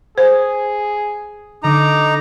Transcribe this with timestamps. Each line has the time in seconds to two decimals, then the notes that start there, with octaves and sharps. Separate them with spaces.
0.18 G#4 C5
1.63 D3 D#4 D#5 A#5 D6